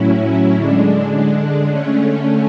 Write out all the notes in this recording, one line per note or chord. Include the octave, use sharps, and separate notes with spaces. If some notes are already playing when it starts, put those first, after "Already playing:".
Already playing: A2 F#3 C#4 E4
D3 G#3 D4
D3 A3 C#4